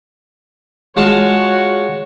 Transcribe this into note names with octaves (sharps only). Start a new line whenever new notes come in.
G#3 F4 F#4 C#5 A5